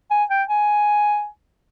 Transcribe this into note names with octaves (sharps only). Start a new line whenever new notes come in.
G#5
G5
G#5